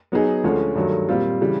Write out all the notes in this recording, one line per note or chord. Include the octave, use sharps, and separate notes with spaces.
F#3 B3 D#4 G#4
D2 D3 F3 G#3 C#4
G2 D#3 F#3 A3
A#2 G3 C4 F4
C#3 E3 G3